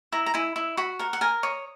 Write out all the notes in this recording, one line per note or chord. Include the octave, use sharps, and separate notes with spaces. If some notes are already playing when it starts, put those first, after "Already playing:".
E4 A#5
A#5
E4 G#5
E4
F#4 B5
A#4 F#5
F#5
A#4 G#5
C#5 D#6